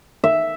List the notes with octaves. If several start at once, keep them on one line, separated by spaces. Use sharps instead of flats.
E5